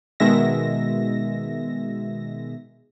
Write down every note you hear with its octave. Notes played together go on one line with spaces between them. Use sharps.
B2 D#3 G#3 E5 A#6